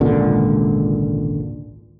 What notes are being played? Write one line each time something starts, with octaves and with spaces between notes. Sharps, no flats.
G#1 C#2 A#2 D3